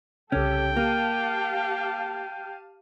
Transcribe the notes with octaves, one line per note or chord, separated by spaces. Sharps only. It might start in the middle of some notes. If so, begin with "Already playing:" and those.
C2 C#3 C#4 G4 A4 G5
A#3 G4 F5 A5 F6 D#7